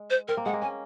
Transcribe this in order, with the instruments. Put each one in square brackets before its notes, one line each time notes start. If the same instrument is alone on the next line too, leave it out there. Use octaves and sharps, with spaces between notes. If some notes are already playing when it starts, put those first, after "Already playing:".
Already playing: [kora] G#3
[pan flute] C5
[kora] C4 [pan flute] A#4
[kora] A#3
[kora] G#3 [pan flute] F#5
[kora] A#3
[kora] C#4 [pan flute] G#5